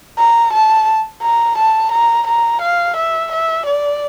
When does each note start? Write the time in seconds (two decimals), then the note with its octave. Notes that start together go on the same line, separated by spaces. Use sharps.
0.18 A#5
0.53 A5
1.23 A#5
1.58 A5
1.92 A#5
2.27 A#5
2.62 F5
2.97 E5
3.32 E5
3.66 D5